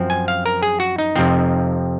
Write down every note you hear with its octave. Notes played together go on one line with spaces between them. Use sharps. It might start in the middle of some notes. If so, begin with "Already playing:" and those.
Already playing: F#2 F3 C4
G#5
F5
A#4
G#4
F#4
D#4
F2 C3 F3 C4